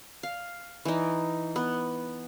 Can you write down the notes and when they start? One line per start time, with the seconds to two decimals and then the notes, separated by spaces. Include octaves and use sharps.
0.23 F5
0.85 E3 D#4
1.56 B3